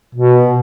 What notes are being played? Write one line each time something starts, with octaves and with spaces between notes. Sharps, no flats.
B2